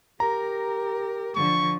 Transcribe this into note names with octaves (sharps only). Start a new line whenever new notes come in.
G4 A#4 A#5
D3 F3 C#6